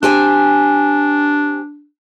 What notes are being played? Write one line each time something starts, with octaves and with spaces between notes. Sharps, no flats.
C4 D4 G4 G#5